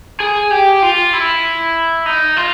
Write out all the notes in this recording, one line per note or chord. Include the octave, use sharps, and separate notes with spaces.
G#4
G4
F4
E4
D#4
F4